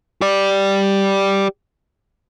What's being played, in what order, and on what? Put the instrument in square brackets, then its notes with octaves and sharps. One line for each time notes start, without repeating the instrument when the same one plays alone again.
[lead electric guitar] G4 D5